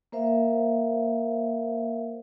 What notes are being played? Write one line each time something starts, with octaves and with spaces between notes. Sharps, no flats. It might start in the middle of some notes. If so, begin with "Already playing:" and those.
A#3 A#4 C5 E5 F5